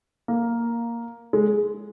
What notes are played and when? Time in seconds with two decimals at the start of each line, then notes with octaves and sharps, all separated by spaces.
0.28 A#3
1.33 G#3